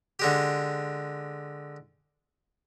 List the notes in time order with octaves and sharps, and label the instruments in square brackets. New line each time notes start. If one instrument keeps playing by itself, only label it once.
[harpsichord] D3 G#3 G4